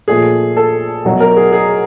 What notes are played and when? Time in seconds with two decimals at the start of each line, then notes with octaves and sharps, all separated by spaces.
0.08 A#2 F3 A3 G#4
0.57 A4
1.05 B2 F#3 A3
1.20 A#4
1.36 G#4
1.52 G#4